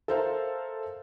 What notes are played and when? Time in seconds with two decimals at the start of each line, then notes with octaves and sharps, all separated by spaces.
0.08 A4 A#4 C5 E5 F5